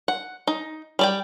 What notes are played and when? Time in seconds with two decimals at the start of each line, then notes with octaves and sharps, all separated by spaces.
0.08 F#5
0.47 D#4
0.99 G3 D5 G5